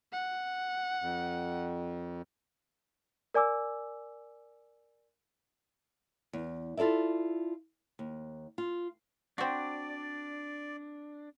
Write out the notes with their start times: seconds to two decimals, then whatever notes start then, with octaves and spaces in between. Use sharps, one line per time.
0.13 F#5
1.01 F2
3.34 A#4 D5 G#5 D6 E6
6.33 E2
6.77 E4 F4 A4 D5 E5
7.99 D#2
8.58 F4
9.38 C4 D4 F#4 D5